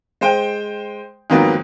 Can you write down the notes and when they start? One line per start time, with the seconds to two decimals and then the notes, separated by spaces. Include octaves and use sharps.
0.21 G#3 C5 G5
1.30 F2 G#2 D#3 F#3 A#3 B3